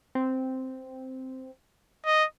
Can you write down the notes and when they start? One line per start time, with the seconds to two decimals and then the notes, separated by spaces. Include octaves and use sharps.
0.15 C4
2.06 D#5